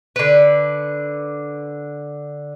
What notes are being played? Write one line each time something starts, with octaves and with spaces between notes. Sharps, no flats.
D3 B4